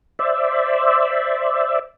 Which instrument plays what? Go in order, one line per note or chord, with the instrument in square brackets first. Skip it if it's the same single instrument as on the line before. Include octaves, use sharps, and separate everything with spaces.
[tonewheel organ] C5 D5 E5